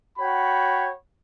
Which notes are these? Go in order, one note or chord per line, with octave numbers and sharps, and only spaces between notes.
F#4 C#5 G5 B5